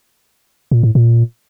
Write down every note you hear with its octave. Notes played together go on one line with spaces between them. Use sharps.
A#2
A2
A#2